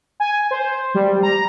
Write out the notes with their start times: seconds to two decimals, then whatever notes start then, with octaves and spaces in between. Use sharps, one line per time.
0.20 G#5
0.51 C5
0.94 G3
1.23 A#5